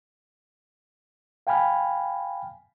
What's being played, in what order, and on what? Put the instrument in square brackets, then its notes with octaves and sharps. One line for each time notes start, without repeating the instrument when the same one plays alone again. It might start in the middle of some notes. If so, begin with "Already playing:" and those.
[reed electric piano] F5 G5 G#5 B5 F6